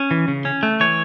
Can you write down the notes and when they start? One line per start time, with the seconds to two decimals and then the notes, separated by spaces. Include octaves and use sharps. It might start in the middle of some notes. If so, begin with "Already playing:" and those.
Already playing: C#4
0.11 E3
0.28 C#3
0.45 C#4
0.63 A3
0.80 E3 C#5